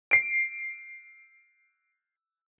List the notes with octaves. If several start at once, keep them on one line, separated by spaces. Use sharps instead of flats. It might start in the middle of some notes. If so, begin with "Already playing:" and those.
C7 D7